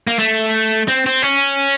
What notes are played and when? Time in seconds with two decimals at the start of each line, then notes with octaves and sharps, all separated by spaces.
0.07 A#3
0.19 A3
0.88 C4
1.06 C4
1.23 C#4